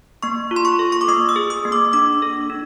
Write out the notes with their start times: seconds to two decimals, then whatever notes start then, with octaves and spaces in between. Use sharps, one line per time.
0.23 A#3 C#6
0.51 F4
0.56 C6
0.65 C#6
0.79 A4
0.92 C#6
1.01 D6
1.08 A#3 D#6
1.29 E6
1.36 G#4
1.50 D#6
1.65 A#3
1.72 D6
1.93 D4 D6
2.22 A4
2.50 D4